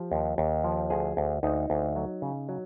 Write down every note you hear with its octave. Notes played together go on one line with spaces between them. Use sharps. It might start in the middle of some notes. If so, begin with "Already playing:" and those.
Already playing: F3 G4
D#2
D#2
F3
D2 G#4
D2
D2 D#4
D2
F#3
C#3
F#3